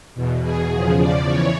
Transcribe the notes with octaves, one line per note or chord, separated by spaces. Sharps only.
E2 B2
G#4
E2 C#3 F3
D5
E3 C#5